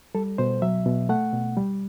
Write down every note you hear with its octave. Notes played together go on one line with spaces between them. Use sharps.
G3 A4
B2 C5
F#3 E5
B2
A3 F#5
B2
G3